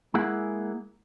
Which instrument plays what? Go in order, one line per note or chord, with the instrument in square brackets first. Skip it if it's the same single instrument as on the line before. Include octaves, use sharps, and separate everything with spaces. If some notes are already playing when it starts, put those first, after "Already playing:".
[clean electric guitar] G#3 A#3 E4 G#4 F#5